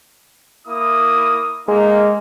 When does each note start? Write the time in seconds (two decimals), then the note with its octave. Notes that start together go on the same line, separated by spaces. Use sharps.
0.67 A#3 E4 D#6
1.68 G#3 A#3 D#4